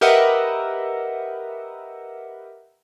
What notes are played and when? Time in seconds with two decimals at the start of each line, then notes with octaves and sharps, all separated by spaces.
0.01 G4 A#4 B4 D#5 E5 F#5